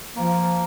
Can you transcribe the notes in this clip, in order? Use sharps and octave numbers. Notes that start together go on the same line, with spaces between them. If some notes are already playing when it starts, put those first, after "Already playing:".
F3 A#3